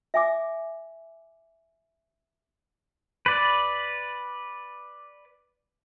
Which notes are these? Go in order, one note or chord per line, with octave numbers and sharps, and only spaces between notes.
E5 G#5 D6
B4 D5